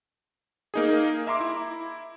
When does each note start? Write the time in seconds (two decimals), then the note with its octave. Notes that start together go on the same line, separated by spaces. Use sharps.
0.74 A#3 D#4 G#4
1.27 E5 A#5 C6 D6
1.41 E4